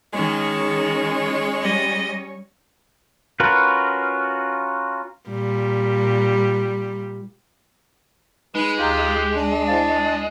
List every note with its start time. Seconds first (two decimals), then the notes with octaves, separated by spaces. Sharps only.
0.13 D#3 G#3 C#4 C#5
1.61 G3 D#5
3.40 C#4 F4 F#4 A#4 B4
5.29 A#2 G3
8.55 G#3 D#4 B4
8.79 D2 F4 G4 A#5
9.35 D4
9.68 E4 C5 F5 A5